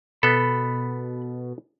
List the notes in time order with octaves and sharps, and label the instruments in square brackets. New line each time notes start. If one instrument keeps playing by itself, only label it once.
[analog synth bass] B2 [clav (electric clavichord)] B3 A4 [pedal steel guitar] B5